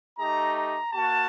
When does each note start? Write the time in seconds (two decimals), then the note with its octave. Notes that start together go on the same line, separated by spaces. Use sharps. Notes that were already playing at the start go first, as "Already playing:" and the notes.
0.17 A3 D#4 G4 A#5
0.55 A#5
0.93 A#3 F#4 A5